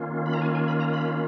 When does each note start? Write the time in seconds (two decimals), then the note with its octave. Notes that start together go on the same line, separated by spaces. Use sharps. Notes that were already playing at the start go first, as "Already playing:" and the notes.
Already playing: D#3 A#3 C#4 F4
0.26 B5
0.34 A#5
0.41 G#5
0.55 G#5
0.68 B5
0.80 A#5
0.93 B5